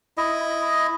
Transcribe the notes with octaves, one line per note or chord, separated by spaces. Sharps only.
E4 D#5